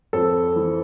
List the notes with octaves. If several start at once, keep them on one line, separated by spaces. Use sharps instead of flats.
F2 A4
E3